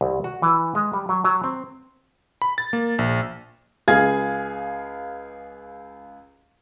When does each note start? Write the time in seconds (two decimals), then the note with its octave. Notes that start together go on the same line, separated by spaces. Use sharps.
0.01 C2
0.24 F#4
0.42 E3
0.75 G#3
0.93 G3
1.09 F#3
1.24 F#3
1.44 C4
2.42 B5
2.58 A6
2.73 A#3
2.99 A#1
3.88 C#2 G#4 F5 G#6